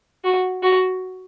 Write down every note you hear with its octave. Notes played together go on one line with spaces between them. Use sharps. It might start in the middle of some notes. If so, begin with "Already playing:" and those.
F#4
F#4